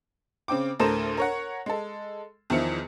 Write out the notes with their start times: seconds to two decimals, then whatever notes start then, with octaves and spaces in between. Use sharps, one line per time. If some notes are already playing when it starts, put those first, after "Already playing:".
0.48 C#3 C4 G5 D6
0.80 D2 A2 A4 A#4 C5 E7
1.17 A#4 C#5 F#5
1.66 G#3 A4
2.50 E2 D#3 F3 E4 C#7